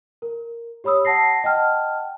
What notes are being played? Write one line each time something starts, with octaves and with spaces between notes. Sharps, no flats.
A#4
G4 C#5 B5 D#6 E6
F#5 A5 A#6 C7
D#5 F#5 G5 A5 F6